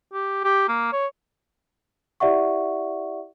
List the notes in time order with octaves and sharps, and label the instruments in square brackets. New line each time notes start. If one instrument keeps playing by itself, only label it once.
[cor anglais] G4
G4
A#3
C#5
[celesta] E4 G4 D5 E5 F#5 C#6